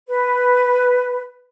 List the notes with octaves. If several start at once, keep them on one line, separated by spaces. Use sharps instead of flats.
B4